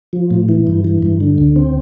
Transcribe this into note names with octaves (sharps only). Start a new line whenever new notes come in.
F3
A2
E3
G2
E3
G2
D3
D2
C4